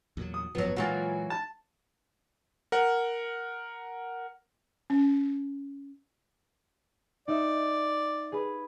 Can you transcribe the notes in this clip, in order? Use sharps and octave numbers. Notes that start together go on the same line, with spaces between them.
E2 A#2 F#3
D#6
G#1 F#2 F3 F#3 B3
A#2 E3 F#3 G#3 A#3 F4 F#4
A5
A#4 F#5
C#4
D#4 D5 E5
G#4 B4